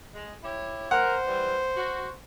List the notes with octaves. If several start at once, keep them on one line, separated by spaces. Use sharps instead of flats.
G#3
E4 G4 C#5
A#4 C5 F#5
E3 G3
F#4